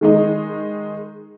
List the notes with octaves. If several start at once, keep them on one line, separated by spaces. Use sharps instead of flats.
D#3 G#3 D#4